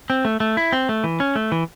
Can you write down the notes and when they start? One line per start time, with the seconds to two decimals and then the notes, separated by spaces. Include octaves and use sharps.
0.10 C4
0.25 A3
0.40 A3
0.57 E4
0.72 C4
0.89 A3
1.04 E3
1.20 C#4
1.36 A3
1.52 E3